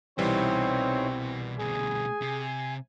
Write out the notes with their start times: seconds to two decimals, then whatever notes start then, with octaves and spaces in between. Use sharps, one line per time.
0.18 C2 B2 E3 G3 C4 D#4 E4 C#5
1.59 D2 B2 G#4 G#5
2.22 C3